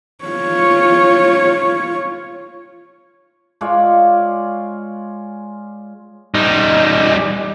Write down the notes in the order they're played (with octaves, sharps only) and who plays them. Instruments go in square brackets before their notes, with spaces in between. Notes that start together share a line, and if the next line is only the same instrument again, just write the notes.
[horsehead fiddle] F4 C#5
[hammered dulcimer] G#3 F4 C#5 D5
[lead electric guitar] G3 D#4